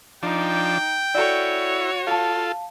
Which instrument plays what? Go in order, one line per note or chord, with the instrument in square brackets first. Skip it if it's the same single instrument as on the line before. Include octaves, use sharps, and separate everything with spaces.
[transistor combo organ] F3 D4 [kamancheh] D#4 [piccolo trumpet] G5
[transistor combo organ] E4 [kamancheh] F#4 C#5 [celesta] A4 D5
[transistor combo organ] F4 A4 [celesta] F5 A5